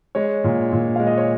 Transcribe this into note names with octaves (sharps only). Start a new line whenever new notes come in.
G#3 C#5
A#2
A#2
G#3 F5
D#5
C#5